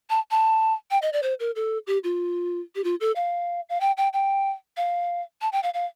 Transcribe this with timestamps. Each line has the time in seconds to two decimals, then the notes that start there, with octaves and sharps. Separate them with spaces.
0.10 A5
0.31 A5
0.91 G5
1.02 D#5
1.13 D5
1.23 C5
1.40 A#4
1.56 A4
1.87 G4
2.04 F4
2.76 G4
2.84 F4
3.01 A4
3.16 F5
3.69 F5
3.81 G5
3.97 G5
4.13 G5
4.77 F5
5.41 A5
5.53 G5
5.63 F5
5.74 F5